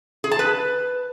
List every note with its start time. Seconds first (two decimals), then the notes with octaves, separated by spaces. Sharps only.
0.24 G#4
0.31 A5
0.39 B4